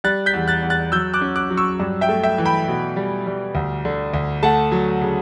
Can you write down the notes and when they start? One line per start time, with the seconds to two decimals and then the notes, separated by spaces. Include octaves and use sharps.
0.04 G3 F#6 A6
0.26 G6 B6
0.33 E2
0.48 F#6 A6
0.63 E2
0.70 F#6 A6
0.92 F#3 E6 G6
1.14 D6 F#6
1.21 C#4
1.36 D6 F#6
1.50 F#3
1.57 C#6 E6
1.80 G2
2.01 E5 G5
2.09 A3
2.23 E5 G5
2.38 E3
2.45 G5 B5
2.68 B2
2.96 G3
3.27 G3
3.55 D2
3.85 D3
4.14 D2
4.42 A3 F#5 A5
4.72 F#3
5.01 C#3